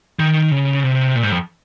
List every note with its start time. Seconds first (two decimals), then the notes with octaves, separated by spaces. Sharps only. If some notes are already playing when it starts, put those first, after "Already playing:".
0.19 D#3
0.51 C#3
0.83 C3
1.16 A#2
1.23 G#2
1.32 F2